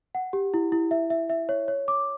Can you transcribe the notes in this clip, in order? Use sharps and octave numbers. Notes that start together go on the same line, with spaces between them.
F#5
G4
E4
E4
E5
E5
E5
C#5
C#5
D6